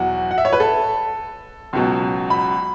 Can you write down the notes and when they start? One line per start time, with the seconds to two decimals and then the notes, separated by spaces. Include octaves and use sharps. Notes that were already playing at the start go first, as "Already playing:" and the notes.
Already playing: E2 B2 F#3 F#4
0.31 F#5
0.38 E5
0.45 C#5
0.53 B4
0.60 A4
1.73 C#2 B2 F#3
2.30 B5